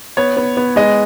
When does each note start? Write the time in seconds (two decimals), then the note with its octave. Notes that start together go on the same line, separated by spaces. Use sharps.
0.17 B3 C#5
0.37 B3
0.57 B3
0.76 G#3 D#5